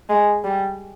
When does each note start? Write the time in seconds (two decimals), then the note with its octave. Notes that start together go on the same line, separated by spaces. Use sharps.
0.09 G#3
0.44 G3